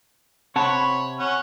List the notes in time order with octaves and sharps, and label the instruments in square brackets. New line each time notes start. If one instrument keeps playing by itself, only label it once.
[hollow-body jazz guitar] C3 F#5 A5 [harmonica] C#5 B5
[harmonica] C#4 F#5